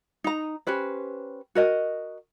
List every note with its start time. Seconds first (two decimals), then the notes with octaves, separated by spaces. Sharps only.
0.24 D#4 A#5
0.67 C#4 G4 B4 C5
1.55 F#4 A#4 D#5